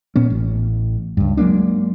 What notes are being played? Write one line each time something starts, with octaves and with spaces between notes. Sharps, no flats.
A#2 B3 C#4
A1
C#2 G2
F#3 G#3 A#3 D4